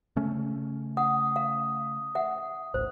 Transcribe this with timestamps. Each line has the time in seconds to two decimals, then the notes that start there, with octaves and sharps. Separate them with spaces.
0.16 C#3 A3 C#4
0.97 F#5 D#6
1.36 F5
2.15 E5 F#5
2.74 D1 A1 C5